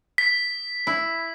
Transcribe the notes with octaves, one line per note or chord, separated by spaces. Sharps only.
B6
E4